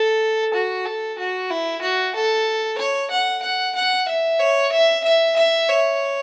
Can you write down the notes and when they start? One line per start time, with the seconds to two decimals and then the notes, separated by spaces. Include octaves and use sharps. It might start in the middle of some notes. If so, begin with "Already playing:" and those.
Already playing: A4
0.54 F#4
0.86 A4
1.19 F#4
1.50 E4
1.82 F#4
2.15 A4
2.78 C#5
3.11 F#5
3.43 F#5
3.75 F#5
4.08 E5
4.40 C#5
4.72 E5
5.04 E5
5.37 E5
5.69 C#5